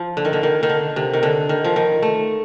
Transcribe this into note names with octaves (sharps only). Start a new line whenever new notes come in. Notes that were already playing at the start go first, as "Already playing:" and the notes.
Already playing: F3
D3
D#3
D3
D#3
D#3
D3
C3
D#3
D3
D#3
F3
D#3
A3